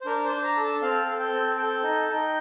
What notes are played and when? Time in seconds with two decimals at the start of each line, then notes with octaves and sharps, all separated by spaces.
0.01 C5
0.06 D4 A#4
0.25 C5
0.32 D4
0.44 A#5
0.56 A4
0.63 A5
0.82 C4 F5
1.07 A4
1.20 G5
1.33 C4
1.58 A4 G5
1.83 D#4
2.09 D#4